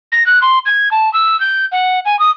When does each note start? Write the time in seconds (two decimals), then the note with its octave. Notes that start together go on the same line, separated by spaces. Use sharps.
0.12 A#6
0.26 F#6
0.42 C6
0.66 G#6
0.91 A5
1.13 E6
1.40 G6
1.72 F#5
2.05 G#5
2.19 D#6